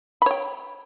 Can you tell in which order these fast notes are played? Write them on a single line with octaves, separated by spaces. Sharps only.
B5 C#5 G5